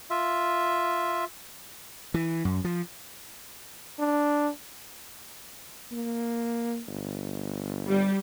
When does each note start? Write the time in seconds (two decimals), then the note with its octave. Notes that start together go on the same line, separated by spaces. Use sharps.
0.10 F4 E5
2.14 E3
2.45 F#2
2.64 F3
3.99 D4
5.92 A#3
6.87 G1
7.88 G3